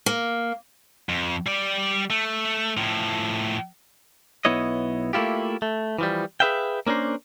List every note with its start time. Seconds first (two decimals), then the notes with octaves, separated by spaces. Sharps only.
0.06 A#3
1.09 F2
1.47 G3 D5
2.10 A3
2.77 A2 F3
4.45 B1 B3 E4 C#5 D#5
5.13 A3 A#3 E4 F4 G4
5.62 A3
5.98 E3 F3 G3
6.40 G#4 A#4 B4 E5 F5 G5
6.87 A#3 C#4 D4 A#4 C5